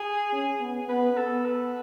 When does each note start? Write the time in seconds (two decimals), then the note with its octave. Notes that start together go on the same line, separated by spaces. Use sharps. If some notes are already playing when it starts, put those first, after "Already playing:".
Already playing: G#4
0.33 C#4
0.60 B3
0.89 B3 B4
1.17 B3 A4
1.45 B4